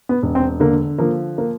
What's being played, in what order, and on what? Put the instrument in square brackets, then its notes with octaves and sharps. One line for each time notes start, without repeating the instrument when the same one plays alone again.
[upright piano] B3
E1
C4
D3 A#3
F3 A#3
A#3